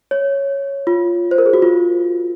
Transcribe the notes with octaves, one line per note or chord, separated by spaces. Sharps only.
C#5
F4
C5
A#4
G#4
F#4
F4